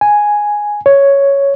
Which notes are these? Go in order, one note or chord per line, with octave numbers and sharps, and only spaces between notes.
G#5
C#5